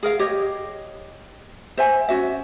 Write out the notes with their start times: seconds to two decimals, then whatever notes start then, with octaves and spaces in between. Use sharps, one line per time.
0.03 G#4 A#4 F5
0.19 G4 C#5 D#5
1.77 C5 E5 G#5
2.09 C#4 F#4 E5